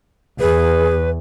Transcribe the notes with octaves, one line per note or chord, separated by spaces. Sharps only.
E2 G#4 B4